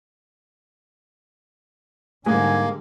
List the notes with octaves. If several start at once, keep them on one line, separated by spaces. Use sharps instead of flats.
G#2 D3 G3 G#3 A#3 G#5